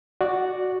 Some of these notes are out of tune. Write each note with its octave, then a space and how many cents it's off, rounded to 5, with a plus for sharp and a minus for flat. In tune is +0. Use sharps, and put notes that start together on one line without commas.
F#4 +0 D5 +0